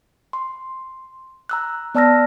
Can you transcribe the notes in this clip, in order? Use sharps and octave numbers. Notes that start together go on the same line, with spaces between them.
C6
A#5 E6 F#6
B3 D5 A5 E6 F6 A#6